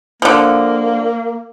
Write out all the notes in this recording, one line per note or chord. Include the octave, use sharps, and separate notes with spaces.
D3 F3 A#3